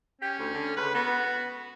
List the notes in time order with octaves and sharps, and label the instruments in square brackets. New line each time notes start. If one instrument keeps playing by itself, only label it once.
[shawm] C#4 [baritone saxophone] G4
[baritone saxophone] D2
D3
[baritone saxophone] C#2 [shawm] B4
[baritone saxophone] B3 [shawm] F#4